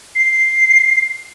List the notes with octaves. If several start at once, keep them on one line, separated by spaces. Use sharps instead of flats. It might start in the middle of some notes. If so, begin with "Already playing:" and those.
C7